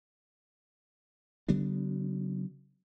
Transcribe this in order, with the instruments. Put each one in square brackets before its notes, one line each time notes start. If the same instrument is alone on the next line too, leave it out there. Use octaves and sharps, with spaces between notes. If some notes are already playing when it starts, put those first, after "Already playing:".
[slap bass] C#3 F#3 B3 D4